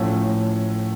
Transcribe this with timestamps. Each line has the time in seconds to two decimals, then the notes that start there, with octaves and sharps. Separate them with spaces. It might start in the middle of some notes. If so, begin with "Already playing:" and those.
Already playing: A2 F3 A3 C#4